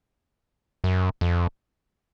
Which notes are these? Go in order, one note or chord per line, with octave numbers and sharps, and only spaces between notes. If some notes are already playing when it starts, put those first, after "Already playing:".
F#2
F2